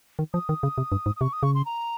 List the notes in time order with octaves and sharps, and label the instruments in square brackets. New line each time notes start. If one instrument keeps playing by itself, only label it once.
[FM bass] D#3
[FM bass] F3 [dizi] D#6
[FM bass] D#3
C#3
C3
G2
G#2
[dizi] D#6
[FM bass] C3 [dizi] C#6
[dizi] D#6
[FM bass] C#3 [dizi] C#6
[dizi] C6
A#5